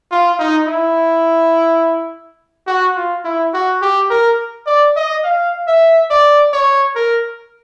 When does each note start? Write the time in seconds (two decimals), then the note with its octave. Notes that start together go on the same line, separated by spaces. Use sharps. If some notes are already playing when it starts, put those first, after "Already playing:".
0.11 F4
0.39 D#4
0.67 E4
2.67 F#4
2.96 F4
3.25 E4
3.53 F#4
3.82 G4
4.10 A#4
4.67 D5
4.96 D#5
5.24 F5
5.68 E5
6.10 D5
6.53 C#5
6.96 A#4